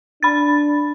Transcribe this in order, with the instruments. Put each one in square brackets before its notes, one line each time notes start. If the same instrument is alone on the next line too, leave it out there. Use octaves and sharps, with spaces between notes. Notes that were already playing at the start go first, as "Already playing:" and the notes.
[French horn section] D4 [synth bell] B5 A6